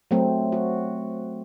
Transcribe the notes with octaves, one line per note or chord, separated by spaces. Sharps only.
F#3 A3 C4
F#4